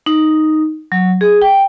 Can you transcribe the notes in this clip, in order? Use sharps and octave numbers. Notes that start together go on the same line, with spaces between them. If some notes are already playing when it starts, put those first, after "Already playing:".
D#4
F#3
G#4
G5